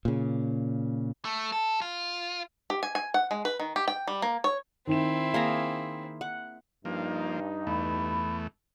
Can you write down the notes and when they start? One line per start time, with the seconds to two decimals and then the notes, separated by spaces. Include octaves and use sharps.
0.05 A#2 C#3
1.25 A3
1.52 A4
1.81 F4
2.70 G4
2.83 G#5
2.95 G#5
3.14 F#5
3.31 G#3
3.45 B4
3.60 D#3
3.76 G4
3.88 G5
4.08 G3
4.22 A#3
4.44 C#5
4.87 D#3 C4 D#4 E4 E7
5.34 A#3 G#4 A#5
6.21 F#5
6.85 G2 F3 A#3 D#4
7.67 E2 A3 B5